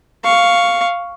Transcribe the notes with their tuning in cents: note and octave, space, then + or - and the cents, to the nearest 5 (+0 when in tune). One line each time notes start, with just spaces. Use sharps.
F5 +0 C#6 +5